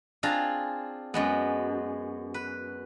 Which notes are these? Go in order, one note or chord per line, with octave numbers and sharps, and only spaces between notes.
C4 D4 F4 G#4 A#5
F#2 G#3 B3
B4